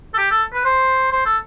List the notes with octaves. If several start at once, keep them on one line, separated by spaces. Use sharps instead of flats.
A4
G4
A4
B4
C5
C5
A4